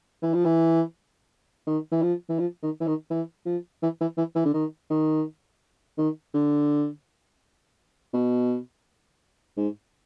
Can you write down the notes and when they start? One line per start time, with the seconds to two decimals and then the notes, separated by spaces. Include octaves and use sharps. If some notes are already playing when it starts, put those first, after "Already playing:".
0.22 E3
0.34 F3
0.45 E3
1.67 D#3
1.92 E3
2.03 F3
2.29 E3
2.39 F3
2.63 D#3
2.80 E3
2.87 D#3
3.10 E3
3.46 F3
3.83 E3
4.01 E3
4.17 E3
4.35 E3
4.45 D3
4.54 D#3
4.90 D#3
5.98 D#3
6.34 D3
8.14 B2
9.57 G#2